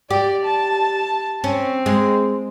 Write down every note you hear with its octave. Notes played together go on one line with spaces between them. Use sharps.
G4 D5
A5
C4 C#4
G#3